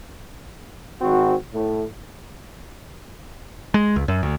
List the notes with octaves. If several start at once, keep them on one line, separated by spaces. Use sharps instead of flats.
G#1 C4 F#4
A2
G#3
C#2
F#2
D2